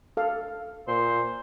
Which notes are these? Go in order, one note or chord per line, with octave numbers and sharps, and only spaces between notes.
A4 F5
A#2 C5